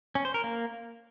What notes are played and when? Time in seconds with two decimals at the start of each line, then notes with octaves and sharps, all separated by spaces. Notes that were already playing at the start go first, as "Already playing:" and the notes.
0.15 C#4
0.25 C5
0.34 A#4
0.44 A#3